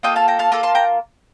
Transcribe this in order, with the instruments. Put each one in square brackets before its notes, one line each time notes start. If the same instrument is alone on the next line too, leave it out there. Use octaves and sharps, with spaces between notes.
[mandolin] A#3 F4 A4 D#5 G5
F5 A5
G5 A#5
F5 A5
A#3 F4 A4
A5 C6
G5 A#5